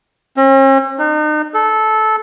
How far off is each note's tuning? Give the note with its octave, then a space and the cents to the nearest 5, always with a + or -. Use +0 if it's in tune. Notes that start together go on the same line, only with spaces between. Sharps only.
C#4 -45
D#4 -40
A4 -15